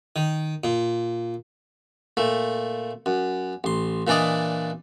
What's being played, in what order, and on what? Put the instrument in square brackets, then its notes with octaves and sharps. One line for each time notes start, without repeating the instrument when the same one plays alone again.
[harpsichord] D#3
A#2
A#2 A3
F#2
A1 C6
A#2 E3 D4 D5 D#5